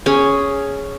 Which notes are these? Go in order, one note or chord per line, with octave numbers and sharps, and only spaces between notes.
C#4 G#4